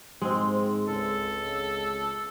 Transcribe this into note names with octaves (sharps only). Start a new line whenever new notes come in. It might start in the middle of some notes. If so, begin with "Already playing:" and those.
G#2 G#3 C4
C#2 A4